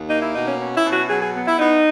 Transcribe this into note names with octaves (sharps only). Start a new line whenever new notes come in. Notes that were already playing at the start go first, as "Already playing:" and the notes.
Already playing: D#2
A#3 D#4
E4
B2 D#4
C#4
C#4
E4
B2
F#4
F#3 G#4
G#4
B3
E4
B3 D#4